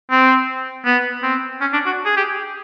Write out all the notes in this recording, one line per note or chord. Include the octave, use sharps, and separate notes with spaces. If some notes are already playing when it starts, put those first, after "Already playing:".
C4
B3
C4
C#4
D4
F#4
G#4
G4